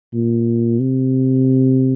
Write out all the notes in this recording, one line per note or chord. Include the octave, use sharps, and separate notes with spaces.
A#2
C3